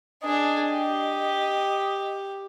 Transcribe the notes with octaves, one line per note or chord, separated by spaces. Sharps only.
D4 G#4 D#5
G4